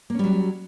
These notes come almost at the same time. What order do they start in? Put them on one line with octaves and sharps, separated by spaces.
A#3 C#4 G3 F#3